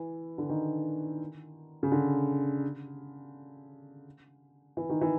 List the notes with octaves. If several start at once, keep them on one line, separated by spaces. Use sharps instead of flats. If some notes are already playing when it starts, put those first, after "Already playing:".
Already playing: E3
D3
D#3
C#3
D3
E3
D#3
E3